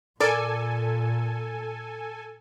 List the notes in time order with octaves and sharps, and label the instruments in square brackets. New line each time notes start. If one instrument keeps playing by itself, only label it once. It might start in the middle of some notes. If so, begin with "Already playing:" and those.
[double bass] A#2 [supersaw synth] A4 G#5 [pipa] A#4 D5